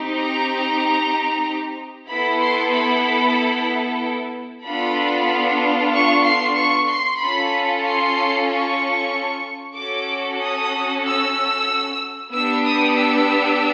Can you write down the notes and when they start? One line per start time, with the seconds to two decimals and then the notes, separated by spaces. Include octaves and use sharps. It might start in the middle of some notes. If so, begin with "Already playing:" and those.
Already playing: C4 D#4 G4
0.16 A#5
2.08 B3 E4 A4 B5
2.40 C6
2.73 B5
4.65 B3 D4 F4 A4 B5
5.93 C#6
6.25 C6
6.56 C#6
6.89 C6
7.20 C#4 F4 A4 B5
7.85 C6
8.48 C#6
9.76 C#4 F#4 A4 D6
10.41 D#6
11.05 E6
12.33 B3 D4 G4 E6
12.65 D#6
12.98 E6